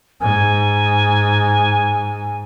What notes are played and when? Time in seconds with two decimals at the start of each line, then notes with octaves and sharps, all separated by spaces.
0.21 G#2 G#5